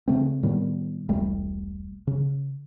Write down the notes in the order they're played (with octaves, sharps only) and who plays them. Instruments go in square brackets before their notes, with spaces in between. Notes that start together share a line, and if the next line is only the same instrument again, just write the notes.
[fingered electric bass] C#3 A3 C4
A2 D#3 G3 B3
E1 C2 G3 A3
C#3